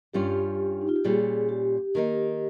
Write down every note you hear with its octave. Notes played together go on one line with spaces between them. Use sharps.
G2 G3 C#4 F4 G4
D#4
F4
G4
A#2 G3 C#4 G#4
G4
D#3 A#3 D#4